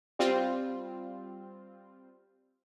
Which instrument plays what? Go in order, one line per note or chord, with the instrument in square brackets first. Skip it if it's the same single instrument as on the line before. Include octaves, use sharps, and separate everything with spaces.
[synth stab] G3 C4 F4